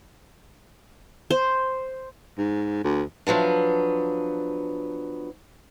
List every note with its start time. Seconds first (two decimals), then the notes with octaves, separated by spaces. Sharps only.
1.30 C5
2.38 G#2
2.84 D2
3.27 F3 F#3 B3 D4